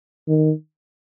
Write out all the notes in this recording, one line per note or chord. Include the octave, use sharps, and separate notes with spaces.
D#3